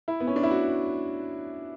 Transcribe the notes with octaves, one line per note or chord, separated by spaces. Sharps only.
E4
B3
C#4
D4
E4
F#4